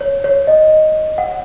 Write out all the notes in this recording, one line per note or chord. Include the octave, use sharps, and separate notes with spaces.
C#5
C#5
D#5
F#5